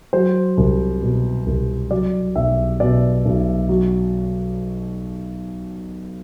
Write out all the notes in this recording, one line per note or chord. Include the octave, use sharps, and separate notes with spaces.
F#3 C5
C2
B2
C2
F#3 D5
B1 E5
B2 D5
B1
F#3